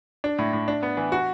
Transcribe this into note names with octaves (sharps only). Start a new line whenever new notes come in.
D4
A2
A2
D4
B3
E3
F#4